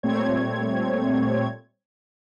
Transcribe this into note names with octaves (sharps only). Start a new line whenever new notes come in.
A#2 G3 A3 C4 C#5 G#6